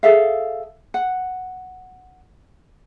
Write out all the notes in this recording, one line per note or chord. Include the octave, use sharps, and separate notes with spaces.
G#4 A4 E5 F5
F#5